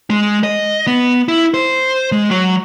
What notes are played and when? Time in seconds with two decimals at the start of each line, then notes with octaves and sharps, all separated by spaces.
0.10 G#3
0.44 D#5
0.87 B3
1.28 E4
1.54 C5
2.12 G#3
2.31 F#3